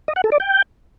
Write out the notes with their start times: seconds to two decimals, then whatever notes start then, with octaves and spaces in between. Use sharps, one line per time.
0.08 D#5
0.16 F#5
0.24 A4
0.32 D5
0.40 G5